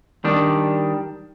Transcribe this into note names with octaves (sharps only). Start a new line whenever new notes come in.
D#3 G3 D4